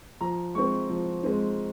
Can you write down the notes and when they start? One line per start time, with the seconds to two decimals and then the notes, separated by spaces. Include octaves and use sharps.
0.21 F3 A#5
0.55 G#3 C4 C#6
0.89 F3
1.23 G#3 C4